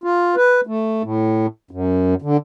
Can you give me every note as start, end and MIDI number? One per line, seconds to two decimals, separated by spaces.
0.04 0.35 65
0.36 0.61 71
0.67 1.02 57
1.03 1.46 45
1.71 2.14 42
2.22 2.37 50